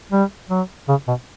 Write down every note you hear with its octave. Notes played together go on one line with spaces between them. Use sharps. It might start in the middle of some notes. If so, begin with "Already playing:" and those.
G3
F#3
C#3
B2